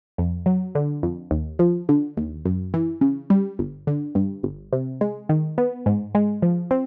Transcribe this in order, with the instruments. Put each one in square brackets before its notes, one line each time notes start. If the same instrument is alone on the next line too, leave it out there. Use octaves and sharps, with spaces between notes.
[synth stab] F2
F#3
D3
F2
D#2
F3
D3
D#2
F#2
E3
C#3
G3
G1
D3
G2
G1
C3
G#3
D#3
B3
G#2
G#3
F3
C4